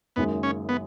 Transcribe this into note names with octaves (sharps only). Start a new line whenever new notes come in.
F#1 F#2 D#3 G#3 B3
C#4
B3